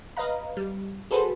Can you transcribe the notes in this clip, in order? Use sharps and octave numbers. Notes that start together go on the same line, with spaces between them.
B4 D#5 F5 A#5
G3
F#4 G#4 A4 B4 C5